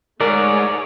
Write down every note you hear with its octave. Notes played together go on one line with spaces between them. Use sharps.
G#2 A3 G#4 A#4 C#5 D5